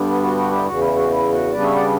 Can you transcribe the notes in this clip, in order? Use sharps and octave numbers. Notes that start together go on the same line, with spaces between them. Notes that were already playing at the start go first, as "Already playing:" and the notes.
Already playing: G2 D3 G3 B3 D4
F#4
F#4
E4 G4
E2 C#3 E3 F#4
E4
F#4
E4
F#4
C#3 G3 B3 D4 B4 D5
C#5 E5
D5 F#5